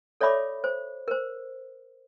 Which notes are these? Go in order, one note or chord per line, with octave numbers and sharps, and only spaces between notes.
A4 C#5 D5 E5 B5 D6
C5
A#4 C5